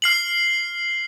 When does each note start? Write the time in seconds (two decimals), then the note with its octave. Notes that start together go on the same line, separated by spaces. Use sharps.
0.02 F6 C7 F#7